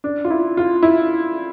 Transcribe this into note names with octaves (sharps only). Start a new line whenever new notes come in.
D4
F4
E4
F4
E4